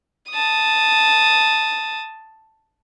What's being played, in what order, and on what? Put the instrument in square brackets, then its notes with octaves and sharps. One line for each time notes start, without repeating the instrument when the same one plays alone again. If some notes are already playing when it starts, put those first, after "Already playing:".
[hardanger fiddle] A5 D#6